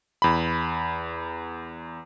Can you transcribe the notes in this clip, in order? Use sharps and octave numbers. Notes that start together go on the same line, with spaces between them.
E2 B5